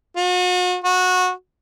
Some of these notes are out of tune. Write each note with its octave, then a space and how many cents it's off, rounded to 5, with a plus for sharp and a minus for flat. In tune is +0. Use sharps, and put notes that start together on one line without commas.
F#4 -40
F#4 -20